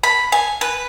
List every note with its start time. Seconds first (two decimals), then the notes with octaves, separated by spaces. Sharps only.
0.04 B5
0.32 G#5
0.61 B4